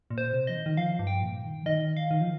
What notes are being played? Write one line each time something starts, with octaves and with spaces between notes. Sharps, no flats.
A#2
C5
C3
F3 D#5
D#3
D#3
F3 F5
G2
G5
A#2
D#3
F3
D#3 D#5
F5
D#3
F3